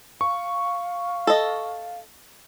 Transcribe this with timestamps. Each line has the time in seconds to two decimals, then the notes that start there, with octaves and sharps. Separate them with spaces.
0.21 F5 C#6
1.27 A4 D#5